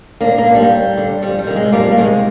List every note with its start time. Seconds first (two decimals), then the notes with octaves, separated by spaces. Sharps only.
0.21 D#2 A#3 D4
0.38 A#3 D4
0.46 D3
0.55 G3
0.72 D#2
0.97 D3
1.22 F2 G3
1.39 G3
1.47 C3 D#3
1.56 G#3
1.72 F2 G3 A#3
1.91 A#3
1.97 C3 D#3 G#3